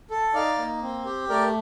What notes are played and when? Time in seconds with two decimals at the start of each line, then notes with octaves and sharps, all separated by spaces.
0.10 A4
0.34 D#4 D5 F5
0.58 A#3
0.82 C4
1.06 G4
1.29 A3 A#4 D5